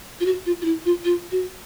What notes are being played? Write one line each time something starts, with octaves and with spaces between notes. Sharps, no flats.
F4
F#4
F4
F4
E4
F4
F4
F#4